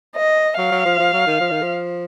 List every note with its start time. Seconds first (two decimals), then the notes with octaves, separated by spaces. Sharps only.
0.16 D#5
0.58 F#3 F5
0.72 F#3
0.85 F3
0.99 F3
1.13 F#3
1.27 D#3
1.40 F3
1.51 D#3
1.62 F3